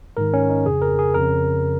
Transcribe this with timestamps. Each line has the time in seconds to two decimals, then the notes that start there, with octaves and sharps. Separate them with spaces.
0.17 G#2 D#3 A#4
0.33 C#4
0.50 D#4
0.66 F2 C#3 G#4
0.82 A#4
0.99 G#4
1.14 F2 C#3 A#4